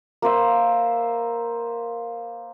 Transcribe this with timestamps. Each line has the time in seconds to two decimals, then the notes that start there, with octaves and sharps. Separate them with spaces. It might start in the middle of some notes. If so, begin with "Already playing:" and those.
0.22 A#3 B4 C5 E5